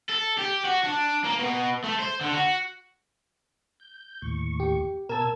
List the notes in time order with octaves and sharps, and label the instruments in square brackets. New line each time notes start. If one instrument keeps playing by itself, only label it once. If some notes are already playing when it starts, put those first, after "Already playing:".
[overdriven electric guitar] A4
G4
F#4
D4
A#3
B2
A3
C5
D3
F#4
[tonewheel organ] G6
D#2 A2 C#6
[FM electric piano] G4
[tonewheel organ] B2 E6 G#6 [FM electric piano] A#4 A5